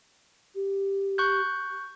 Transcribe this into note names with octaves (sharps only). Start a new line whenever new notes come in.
G4
C#6 F#6 G6